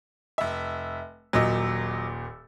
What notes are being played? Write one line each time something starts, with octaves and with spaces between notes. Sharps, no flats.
F1 E5
D#1 A#2 F#3 D#5 E6